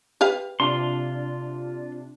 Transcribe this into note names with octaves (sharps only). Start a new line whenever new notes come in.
G4 B4 F5
C3 D4 F4 C6